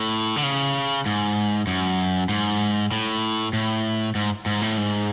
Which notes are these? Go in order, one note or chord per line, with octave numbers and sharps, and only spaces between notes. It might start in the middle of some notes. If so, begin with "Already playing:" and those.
Already playing: A2
D3
C#3
G#2
F#2
G#2
A2
A2
G#2
G#2
A2
G#2